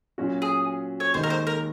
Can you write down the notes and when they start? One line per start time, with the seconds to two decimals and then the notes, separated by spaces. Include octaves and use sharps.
0.18 A#2 F#3 C#4 F#4
0.42 G#4
1.00 C#5
1.14 D#2 D#3 G#3 C5
1.23 A#4
1.30 C5
1.47 A#4